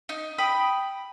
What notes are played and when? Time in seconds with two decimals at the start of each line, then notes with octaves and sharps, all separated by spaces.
0.09 D#4
0.38 G5 B5 D#6